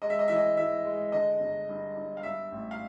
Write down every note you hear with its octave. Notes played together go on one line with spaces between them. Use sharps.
G#3 D#5
E5
D#5
E3 E5
D#5
E3 E5
G#3
D3 D#5
G1
G2
G2
F5
G2 E5
A1
F5